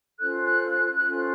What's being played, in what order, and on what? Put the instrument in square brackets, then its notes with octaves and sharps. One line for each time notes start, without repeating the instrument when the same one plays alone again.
[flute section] C#4 F4 A4 C5 F#6
F#6
F#6
F#6
C#4 F4 A4 C5